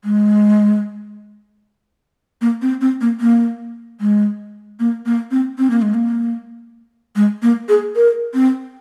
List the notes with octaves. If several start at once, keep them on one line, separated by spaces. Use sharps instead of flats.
G#3
A#3
C4
C4
A#3
A#3
G#3
A#3
A#3
C4
C4
A#3
G#3
A#3
G#3
A#3
G#4
A#4
C4